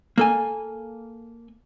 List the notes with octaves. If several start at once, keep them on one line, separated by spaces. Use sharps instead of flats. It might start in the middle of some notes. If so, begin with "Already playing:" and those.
A#3 A4 G#5